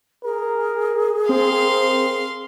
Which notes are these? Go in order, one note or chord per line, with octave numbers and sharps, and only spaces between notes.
G#4 A#4
C4 A#4 F5 C6